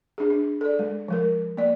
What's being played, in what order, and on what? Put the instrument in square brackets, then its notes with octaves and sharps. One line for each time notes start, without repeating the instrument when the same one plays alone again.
[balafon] D4 G#4
D4
A4 D5
G#3
F3 G#3 A#4
A#3 D5